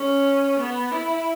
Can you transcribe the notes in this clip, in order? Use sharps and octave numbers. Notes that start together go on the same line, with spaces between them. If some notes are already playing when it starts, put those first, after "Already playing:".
Already playing: C#4
B3
E4